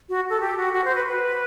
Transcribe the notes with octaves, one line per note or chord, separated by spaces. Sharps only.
F#4
A4
G4
F#4
F#4
C5
B4
B4